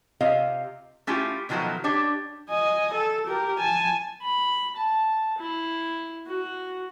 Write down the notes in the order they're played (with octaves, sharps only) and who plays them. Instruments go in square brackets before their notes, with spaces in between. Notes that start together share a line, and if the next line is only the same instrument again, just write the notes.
[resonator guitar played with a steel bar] C3 F4 D#5 F5
A3 C#4 E4 F4 G4
B2 D#3 F3 F#3 A3 B3
D4 G4 C#5
[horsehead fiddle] D#5 G#5
A4
G4 A#4
G#5 A5
[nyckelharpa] B5
A5
E4
F#4